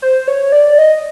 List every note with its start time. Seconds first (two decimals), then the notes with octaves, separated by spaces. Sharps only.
0.02 C5
0.28 C#5
0.52 D5
0.78 D#5